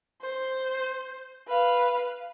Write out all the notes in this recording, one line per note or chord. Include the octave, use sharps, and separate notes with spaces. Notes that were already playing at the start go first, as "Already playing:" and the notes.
C5
B4 F5